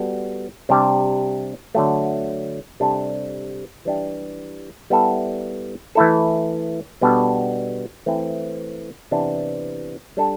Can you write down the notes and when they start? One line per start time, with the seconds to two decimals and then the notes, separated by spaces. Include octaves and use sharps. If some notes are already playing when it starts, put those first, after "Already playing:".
Already playing: G3 B3 F#4 A4
0.69 C3 G3 D4 G4
1.75 D3 F#3 A3
2.80 C3 G3 D4 A4
3.85 E3 G3 D4 G4
4.90 G3 B3 E4 A4
5.95 E3 A3 E4 A4
7.01 B2 G3 B3 D4 A4
8.06 E3 A3 C4 E4
9.11 C3 E3 B3 D4
10.17 G3 D4 A4